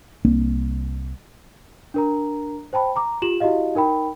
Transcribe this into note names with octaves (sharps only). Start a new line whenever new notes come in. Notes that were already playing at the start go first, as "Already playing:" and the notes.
C2 A#3 C4 D4
D4 A#4 A#5
C5 G5 A5 B5
A#5 D6
F4 G4 E7 F#7
E4 F#4 G4 D#5 F5
D#4 A#4 G5 B5